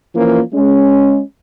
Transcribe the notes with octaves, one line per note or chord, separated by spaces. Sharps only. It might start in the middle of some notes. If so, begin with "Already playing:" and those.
E3 F3 A#3 C#4 F4
G#3 C#4